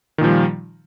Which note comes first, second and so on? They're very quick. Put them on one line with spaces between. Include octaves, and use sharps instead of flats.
D#3 A#2 F3 G3